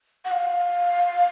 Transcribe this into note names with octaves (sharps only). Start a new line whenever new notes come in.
F#5
F5